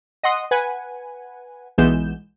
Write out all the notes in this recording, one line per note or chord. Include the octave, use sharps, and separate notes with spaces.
D#5 F#5 C6 D#6
B4 F#5 G#5
B1 E3 G#3 B3 G6 E7